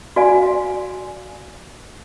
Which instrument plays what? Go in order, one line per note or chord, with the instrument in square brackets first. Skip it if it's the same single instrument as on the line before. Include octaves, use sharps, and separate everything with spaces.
[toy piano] F#4 D5 F5 G#5